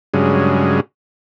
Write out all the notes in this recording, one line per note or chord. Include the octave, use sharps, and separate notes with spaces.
G2 C#3 F#3 G#3